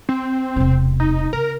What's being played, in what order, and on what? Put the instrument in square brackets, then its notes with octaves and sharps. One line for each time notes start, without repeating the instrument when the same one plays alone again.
[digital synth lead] C4
[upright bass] E1 C3
[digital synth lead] D#4
[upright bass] C#3 [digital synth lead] A#4